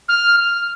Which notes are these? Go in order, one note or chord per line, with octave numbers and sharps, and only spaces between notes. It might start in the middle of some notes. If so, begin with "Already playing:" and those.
F6